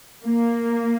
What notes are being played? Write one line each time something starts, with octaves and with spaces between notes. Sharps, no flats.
A#3